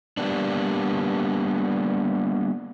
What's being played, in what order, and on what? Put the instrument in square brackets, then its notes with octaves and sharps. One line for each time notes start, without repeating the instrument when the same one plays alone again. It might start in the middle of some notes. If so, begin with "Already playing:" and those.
[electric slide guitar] G3 A#3 B3 D4